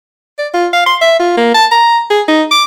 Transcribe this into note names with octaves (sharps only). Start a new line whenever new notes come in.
D5
F4
F5
C6
E5
F4
A#3
A5
A#5
G#4
D#4
D6